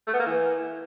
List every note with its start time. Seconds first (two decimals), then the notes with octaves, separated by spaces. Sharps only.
0.07 A3
0.14 B3
0.20 A#3
0.26 E3